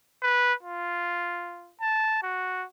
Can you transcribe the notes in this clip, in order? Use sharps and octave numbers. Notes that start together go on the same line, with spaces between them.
B4
F4
A5
F#4